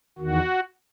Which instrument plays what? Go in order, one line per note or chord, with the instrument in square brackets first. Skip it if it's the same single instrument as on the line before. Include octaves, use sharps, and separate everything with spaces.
[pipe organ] E2 D#3 F#4